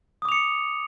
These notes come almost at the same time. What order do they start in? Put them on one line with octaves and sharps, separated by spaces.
D#6 D6 F7 C#7